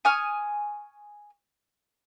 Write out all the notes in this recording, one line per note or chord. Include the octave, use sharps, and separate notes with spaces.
G#5 C#6 D#6 F6